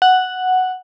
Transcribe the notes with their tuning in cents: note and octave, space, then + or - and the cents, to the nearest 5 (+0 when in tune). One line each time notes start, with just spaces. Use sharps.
F#5 +0